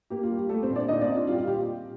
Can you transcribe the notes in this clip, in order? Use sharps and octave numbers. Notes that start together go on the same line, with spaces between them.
A#3 G4
F4
G3
G4
G3 A3 A4
C4 C5
A#2
D4 D5
A#2 D#4 D#5
D4 D5
C4
F4
G3 F4
G4
F4
A#2 G4